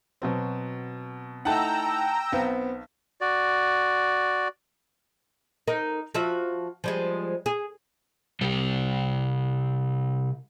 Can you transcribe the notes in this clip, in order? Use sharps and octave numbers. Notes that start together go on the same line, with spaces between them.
B2 F#3 C4
A3 D#4 E4 F#5 G5 A5 A#5 E6
B1 B3 C4
F#4 D5
D#4 A#4
F3 F#4 E5
F3 G3 G#3
G#4
C3 G3 G4 C5